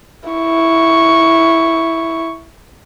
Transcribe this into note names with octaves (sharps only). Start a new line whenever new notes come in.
E4 C#6